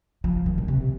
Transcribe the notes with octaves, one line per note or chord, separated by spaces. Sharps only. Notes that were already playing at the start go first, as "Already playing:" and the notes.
F3
D#3
A#2
C3